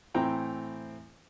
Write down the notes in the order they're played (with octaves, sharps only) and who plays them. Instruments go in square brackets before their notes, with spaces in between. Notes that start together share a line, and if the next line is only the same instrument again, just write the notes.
[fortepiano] A2 E3 C4 G5 A#5